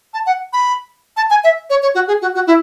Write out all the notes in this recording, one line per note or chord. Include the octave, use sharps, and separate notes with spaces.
A5
F#5
B5
A5
G#5
E5
C#5
C#5
F#4
G#4
F#4
F#4
E4